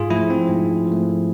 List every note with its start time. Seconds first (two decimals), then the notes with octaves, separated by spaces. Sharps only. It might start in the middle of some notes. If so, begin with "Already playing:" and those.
Already playing: G#2 F4 G#4
0.10 F3 A3 E4
0.30 C4
0.49 G#2
0.87 F3 A3